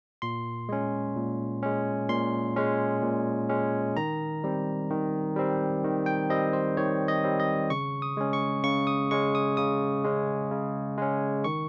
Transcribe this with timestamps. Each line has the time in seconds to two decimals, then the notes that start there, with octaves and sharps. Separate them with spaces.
0.22 A#2 C6
0.69 G#3 C#4
1.16 A#2
1.63 G#3 C#4
2.09 A#2 C6
2.56 G#3 C#4
3.03 A#2
3.49 G#3 C#4
3.97 D#3 A#5
4.44 G3 C4
4.90 D#3
5.36 G3 C4
5.84 D#3
6.06 G5
6.30 G3 C4 D#5
6.53 C5
6.77 D#3 C#5
7.08 D#5
7.24 G3 C4
7.40 D#5
7.70 C#3 C#6
8.02 D#6
8.17 G#3 C#4
8.33 C#6
8.64 C#3 C#6
8.87 D#6
9.11 G#3 C#4 C#6
9.35 D#6
9.57 C#3 D#6
10.04 G#3 C#4
10.51 C#3
10.98 G#3 C#4
11.44 D#3 C#6